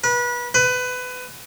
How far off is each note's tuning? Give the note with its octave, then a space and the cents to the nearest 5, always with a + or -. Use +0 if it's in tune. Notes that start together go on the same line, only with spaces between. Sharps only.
B4 -30
B4 +20